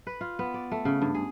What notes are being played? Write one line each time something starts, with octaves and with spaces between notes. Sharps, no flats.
B4
F4
B3
D5
A3
C#3
G2
G#4